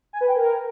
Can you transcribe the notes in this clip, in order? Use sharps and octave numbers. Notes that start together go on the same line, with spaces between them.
G#5
B4
G5
A#4